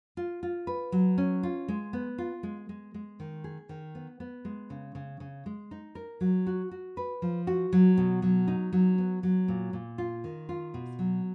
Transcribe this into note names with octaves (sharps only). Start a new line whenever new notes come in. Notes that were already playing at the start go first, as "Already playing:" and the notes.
F4
F4
B4
F#3
C#4
F4
G#3
B3
F4
G#3
G#3
G#3
D#3
G#4
D#3
B3
B3
G#3
C#3
C#3
C#3
G#3
D#4
A#4
F#3
F#4
F#4
B4
F3
F#4
F#3
B2
F#3
D#4
F#3
B3
F#3
A#2
A#2
F4
D#3
F4
B2
F#3